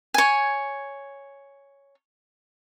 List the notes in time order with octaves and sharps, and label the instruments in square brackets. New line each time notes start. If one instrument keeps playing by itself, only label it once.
[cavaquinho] C#5 G#5